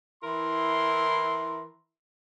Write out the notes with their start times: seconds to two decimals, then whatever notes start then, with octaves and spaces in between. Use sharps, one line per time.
0.24 E3 E4 A#4 C6